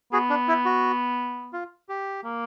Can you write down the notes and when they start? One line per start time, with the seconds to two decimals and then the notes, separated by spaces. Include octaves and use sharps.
0.12 B3 F#4 G#4
0.30 D4
0.48 E4
0.65 F#4
1.53 F4
1.89 G4
2.25 A#3